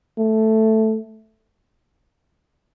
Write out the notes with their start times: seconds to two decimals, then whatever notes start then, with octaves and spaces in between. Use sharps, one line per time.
0.18 A3